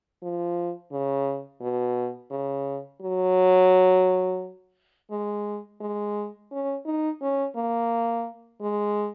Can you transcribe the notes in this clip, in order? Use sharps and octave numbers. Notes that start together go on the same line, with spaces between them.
F3
C#3
B2
C#3
F#3
G#3
G#3
C#4
D#4
C#4
A#3
G#3